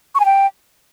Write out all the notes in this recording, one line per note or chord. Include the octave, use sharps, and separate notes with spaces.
C#6
G#5
G5